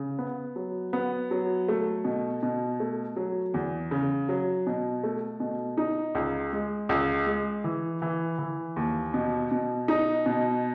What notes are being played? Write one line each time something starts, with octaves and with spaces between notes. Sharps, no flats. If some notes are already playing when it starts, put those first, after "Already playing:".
Already playing: C#3
B3
F#3
B3
F#3
A3
B2
B2
A3
F#3
E2
C#3
F#3
B2
A3
B2
D#4
C#2
G#3
C#2
G#3
E3
E3
E3
D#2
B2
B2
D#4
B2